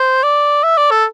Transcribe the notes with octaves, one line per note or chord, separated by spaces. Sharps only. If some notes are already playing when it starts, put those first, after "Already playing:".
Already playing: C5
D5
E5
D5
A4